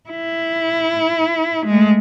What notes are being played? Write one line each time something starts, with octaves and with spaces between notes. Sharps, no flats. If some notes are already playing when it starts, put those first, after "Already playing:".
E4
G#3 A3